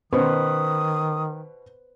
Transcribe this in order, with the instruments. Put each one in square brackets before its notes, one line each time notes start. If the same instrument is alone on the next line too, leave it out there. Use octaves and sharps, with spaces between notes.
[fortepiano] B2 C#4 [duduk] D#3 [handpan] B4 C5 [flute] D#6